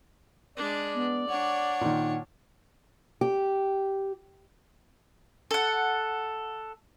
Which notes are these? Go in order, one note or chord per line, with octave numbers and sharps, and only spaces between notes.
G#3 D4 D5
B3
D4 C#5 F#5
A#2 D#3
G4
A4 F#5